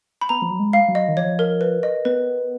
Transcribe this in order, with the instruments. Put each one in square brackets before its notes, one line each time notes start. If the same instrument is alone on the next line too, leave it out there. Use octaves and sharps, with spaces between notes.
[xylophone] B5
[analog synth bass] B3 [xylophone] A#5
[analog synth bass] F3
F#3
G#3
[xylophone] F5
[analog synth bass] F#3
[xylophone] D#5
[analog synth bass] D#3
[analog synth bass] F3 [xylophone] C#5
[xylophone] A#4
B4
D#5
[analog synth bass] B3 [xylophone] B4